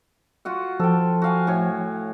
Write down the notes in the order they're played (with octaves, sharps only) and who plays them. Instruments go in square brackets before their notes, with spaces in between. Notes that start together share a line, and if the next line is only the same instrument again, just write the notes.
[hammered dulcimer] F4 F#4 F#5
[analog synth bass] F3 [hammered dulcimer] A4 G5
[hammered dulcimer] F#4 F5 G#5
A2 C#5